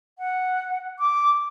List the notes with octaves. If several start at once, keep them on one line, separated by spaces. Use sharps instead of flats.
F#5
D6